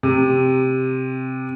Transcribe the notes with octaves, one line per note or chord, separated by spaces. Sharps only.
C3